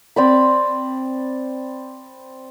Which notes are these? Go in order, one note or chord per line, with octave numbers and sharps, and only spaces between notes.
C4 D5 B5